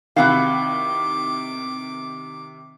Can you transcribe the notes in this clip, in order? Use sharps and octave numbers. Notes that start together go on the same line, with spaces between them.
C3 D#3 E4 F#4 F5 D6